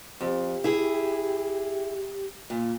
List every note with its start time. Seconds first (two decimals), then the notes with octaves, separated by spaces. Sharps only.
0.21 F2 G4
0.64 E4 G#4
2.50 A#2